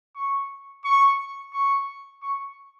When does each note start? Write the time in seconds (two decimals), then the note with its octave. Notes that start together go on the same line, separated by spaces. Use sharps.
0.16 C#6
0.84 C#6
1.53 C#6
2.22 C#6